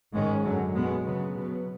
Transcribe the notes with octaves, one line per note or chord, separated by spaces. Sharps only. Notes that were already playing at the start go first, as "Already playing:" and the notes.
G#2 D#3 G#3 C#4
F#2 D3 F#3
B2 G#3 B3
C#3 F#3 B3
B2 F#3 B3